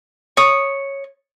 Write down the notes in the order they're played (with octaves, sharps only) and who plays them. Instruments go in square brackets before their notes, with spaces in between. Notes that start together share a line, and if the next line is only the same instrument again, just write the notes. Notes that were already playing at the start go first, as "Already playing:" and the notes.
[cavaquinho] C#5 D#6